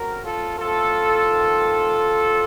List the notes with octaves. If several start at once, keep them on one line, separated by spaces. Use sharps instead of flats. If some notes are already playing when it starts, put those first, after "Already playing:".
Already playing: C#3 A3 C4 F#4 A#4
F4 A4
A2 A3 C4 F4 A4
D#3 A3 C4
C#3 F#3 C4